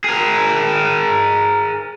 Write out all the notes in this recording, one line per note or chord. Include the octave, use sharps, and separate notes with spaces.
G#4 A#4